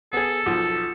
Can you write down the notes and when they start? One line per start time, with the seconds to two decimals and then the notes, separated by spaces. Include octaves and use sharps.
0.13 B3 G#4 A4
0.46 B1 F3